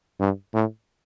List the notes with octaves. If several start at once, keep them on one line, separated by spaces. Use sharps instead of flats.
G2
A2